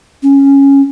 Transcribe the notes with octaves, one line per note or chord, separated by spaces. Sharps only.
C#4